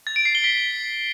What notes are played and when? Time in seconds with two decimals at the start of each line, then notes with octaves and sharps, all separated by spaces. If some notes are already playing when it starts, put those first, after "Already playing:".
0.07 A6
0.16 D7
0.25 C7
0.35 G7
0.44 B6